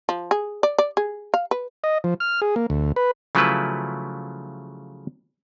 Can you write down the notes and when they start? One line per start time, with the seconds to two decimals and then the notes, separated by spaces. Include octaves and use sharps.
0.09 F3
0.31 G#4
0.63 D5
0.78 D5
0.97 G#4
1.34 F5
1.51 B4
1.84 D#5
2.04 F3
2.20 F6
2.42 G#4
2.56 A#3
2.70 D2
2.96 B4
3.35 C#3 F3 F#3 A3 E4 B4